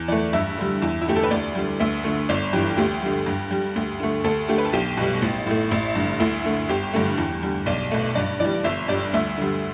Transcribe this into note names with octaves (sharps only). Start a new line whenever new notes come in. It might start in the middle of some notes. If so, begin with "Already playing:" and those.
Already playing: E2
E3 A3 D5
G2 E5
D3 G3
E2
E4
D3 A3 G4
A4
B4
D2 D5
D3 G3
D2 E5
D3 A3
G1 D5
G2 E3 G4
D2 G4
D3 G3
G2
G3
D2
D3 A3
D2 A4
D3 A3 G4
B4
A4
B1 G4
B2 G3
A1
A2 A3
A1 E4
G2 D3
D2 E4
D3 A3
G1 G4
G2 D3 A3
E2
D3 G3
B1 D5
B2 A3
G2 D5
E3 G3 D5
G1 E5
G2 G3 D5
D2 E5
D3 G3